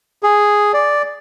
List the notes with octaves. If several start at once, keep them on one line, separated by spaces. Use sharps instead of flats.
G#4
D5